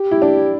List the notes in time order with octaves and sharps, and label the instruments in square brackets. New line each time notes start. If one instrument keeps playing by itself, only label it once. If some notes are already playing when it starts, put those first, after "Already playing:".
Already playing: [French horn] G4
[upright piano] E4
D4